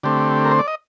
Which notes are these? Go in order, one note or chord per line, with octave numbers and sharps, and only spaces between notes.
D3 A3 C4 G4
A#4
C5
D5
D#5